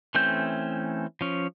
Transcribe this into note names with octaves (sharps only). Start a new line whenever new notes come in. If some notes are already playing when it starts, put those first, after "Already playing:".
E3 A3 C4 C#4 G6
F3 C#4